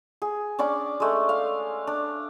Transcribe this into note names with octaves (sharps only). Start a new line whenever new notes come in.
G#4
C#4 D4 D5 D6
G#3 A3
F5
D4